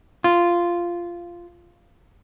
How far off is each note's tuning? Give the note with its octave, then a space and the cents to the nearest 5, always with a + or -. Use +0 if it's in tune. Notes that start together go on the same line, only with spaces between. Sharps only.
F4 -10